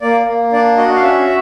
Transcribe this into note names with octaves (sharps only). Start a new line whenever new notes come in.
A#3 D5
A#3
D4 D5
F#4 D#5
F5
C#4 E5